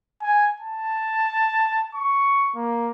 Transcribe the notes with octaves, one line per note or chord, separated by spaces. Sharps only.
G#5
A5
C#6
A#3